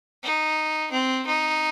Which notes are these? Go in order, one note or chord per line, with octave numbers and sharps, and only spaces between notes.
D#4
C4
D#4